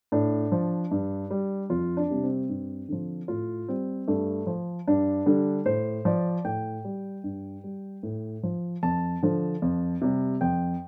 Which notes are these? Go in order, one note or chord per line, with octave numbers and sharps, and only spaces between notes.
A2 D4
F3
G2
G3
F2 F4
D4
C3 G3
C4
G2
D3 F3
A2 F4
G3 C4
G2 A3
F3
G2 D4
D3 G3
A2 C5
F3 D5
A2 G5
G3
G2
G3
A2
F3
F2 A5
D3 F3
F2
C3 G3
F2 G5